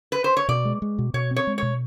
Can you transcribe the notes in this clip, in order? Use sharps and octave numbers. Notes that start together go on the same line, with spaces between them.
B4
C5
C#5
B2 D5
G#3
G#3
B2
B2 C#5
C4
C#5
G#3
B2 C#5